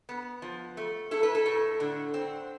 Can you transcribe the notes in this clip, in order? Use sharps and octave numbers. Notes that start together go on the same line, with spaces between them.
B3
F3
A3
E4 A4
B4
A4
A2
D3
C4